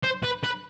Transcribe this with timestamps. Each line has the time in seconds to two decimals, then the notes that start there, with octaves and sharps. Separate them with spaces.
0.03 C5
0.23 B4
0.43 B4